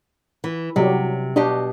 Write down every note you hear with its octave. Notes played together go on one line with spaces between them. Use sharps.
E3
C3 F#3 G3
B2 D4 G4 D#5